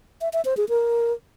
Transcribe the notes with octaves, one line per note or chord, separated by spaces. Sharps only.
E5
E5
C5
G#4
A#4